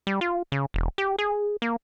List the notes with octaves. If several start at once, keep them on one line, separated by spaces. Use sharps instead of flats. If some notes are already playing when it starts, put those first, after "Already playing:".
G3
F4
C#3
E1
G4
G#4
A#3